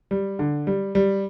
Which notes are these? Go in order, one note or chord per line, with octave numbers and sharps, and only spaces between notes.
G3
D3
G3
G3